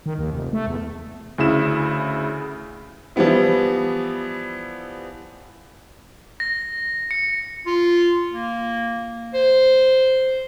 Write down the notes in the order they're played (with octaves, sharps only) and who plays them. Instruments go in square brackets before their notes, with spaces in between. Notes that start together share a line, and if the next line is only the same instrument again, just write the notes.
[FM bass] D#3
D#2
F1
A3
E2
[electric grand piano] D2 C#3 E4 E7
[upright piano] E3 F3 G3 B3 E4
[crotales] A#6
C#7
[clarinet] F4
A#3
C5